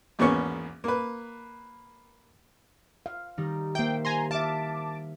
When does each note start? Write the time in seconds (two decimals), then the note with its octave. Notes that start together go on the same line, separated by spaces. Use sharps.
0.19 G#1 E2 A#3 B3 C#4 C#6
0.84 A#3 B4
3.06 F5
3.37 D#3 G3 D#4
3.75 A#3 G4 C5 E5 G5
4.05 G#5 A#5 C6
4.31 E5 F5 A5 D6